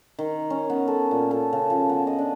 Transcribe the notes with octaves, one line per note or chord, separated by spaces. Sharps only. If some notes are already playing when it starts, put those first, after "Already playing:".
D#3
C#4
B3
A4
A#2
A4
C#3
F3
B3
D#5
D4